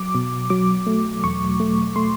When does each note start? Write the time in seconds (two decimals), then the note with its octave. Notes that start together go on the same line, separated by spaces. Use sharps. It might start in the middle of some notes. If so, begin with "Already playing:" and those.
Already playing: F#3 D6
0.15 B2
0.50 F#3 D6
0.86 A3
1.24 E2 C#6
1.60 A3
1.96 A3 C6